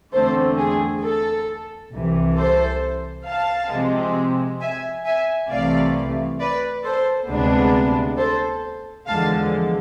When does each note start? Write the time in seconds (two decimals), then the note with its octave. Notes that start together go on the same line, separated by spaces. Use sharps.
0.13 E2 D3 A3 C4 A4 C5
0.58 G#4
1.03 A4
1.92 C2 C3 E3
2.36 A4 C5
3.26 F5 A5
3.70 C3 F3 G#3 C4
4.60 E5 G#5
5.05 E5 G#5
5.50 C2 C3 E3 A3 D5 F5
6.40 B4 D5
6.84 A4 C5
7.28 D2 C3 G#3 B3 D4
8.17 A4 C5
9.07 E2 D3 F3 G#3 F5 A5